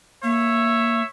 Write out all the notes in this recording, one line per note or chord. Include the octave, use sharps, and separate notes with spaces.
A#3 C#5 E5